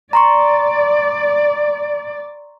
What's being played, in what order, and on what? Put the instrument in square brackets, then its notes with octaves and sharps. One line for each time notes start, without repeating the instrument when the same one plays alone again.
[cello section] D5 [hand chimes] A#5 C6 C#6